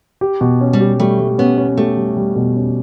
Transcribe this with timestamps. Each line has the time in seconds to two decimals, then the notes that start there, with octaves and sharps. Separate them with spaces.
0.21 G4
0.41 B2
0.61 C#4
0.73 G3
0.80 G4
1.00 G3 A3
1.19 G3
1.38 B3 C#4
1.58 C#4
1.77 A3 G4
1.97 G3
2.17 G3
2.36 B2
2.56 C#4